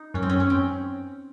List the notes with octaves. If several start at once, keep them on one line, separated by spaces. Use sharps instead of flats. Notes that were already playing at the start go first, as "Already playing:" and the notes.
Already playing: D#4
F#2 C#4
C4
C#4
C#4
C4